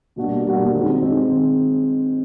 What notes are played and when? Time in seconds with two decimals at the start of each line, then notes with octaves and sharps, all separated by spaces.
0.16 B2 G3 A#3 D4 F#4
0.45 B2 G3 A#3 D4 F#4
0.73 D#3 G#3 C4
1.02 D#3 G#3 C4